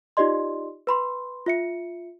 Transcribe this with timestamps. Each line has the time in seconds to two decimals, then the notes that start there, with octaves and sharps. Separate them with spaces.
0.17 D#4 F4 G4 D5 D#5 C6
0.87 B4 B5 C6
1.46 F4 E5 C#7